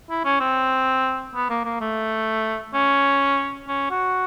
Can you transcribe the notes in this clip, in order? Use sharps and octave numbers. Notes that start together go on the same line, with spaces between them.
E4
C#4
C4
B3
A#3
A#3
A3
C#4
C#4
F#4